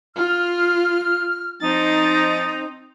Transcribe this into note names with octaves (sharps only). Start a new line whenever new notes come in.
F4 F6
F3 C4 D#4 A6